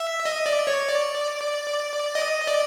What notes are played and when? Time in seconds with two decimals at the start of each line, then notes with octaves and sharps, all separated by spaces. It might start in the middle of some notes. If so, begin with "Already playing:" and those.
Already playing: E5
0.25 D#5
0.46 D5
0.67 C#5
0.89 D5
2.15 D#5
2.47 D5